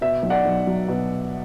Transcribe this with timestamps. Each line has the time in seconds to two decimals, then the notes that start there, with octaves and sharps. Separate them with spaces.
0.01 B2 E5
0.23 B1
0.30 D5 F#5
0.45 B1
0.67 F#3
0.88 B2